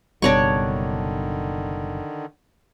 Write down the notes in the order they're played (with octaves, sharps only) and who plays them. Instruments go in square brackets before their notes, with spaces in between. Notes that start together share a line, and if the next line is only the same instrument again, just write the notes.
[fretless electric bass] F#1 B2 G3 [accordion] D3 D#3 [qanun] D4 C#5 C#6